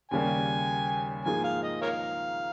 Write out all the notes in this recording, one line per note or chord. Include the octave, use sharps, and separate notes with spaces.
D#2 C#3 G3 A#3 G#5
G#2 F3 A#3 D#4 G#4 G#5
F5
D#5
A#4 C#5 F5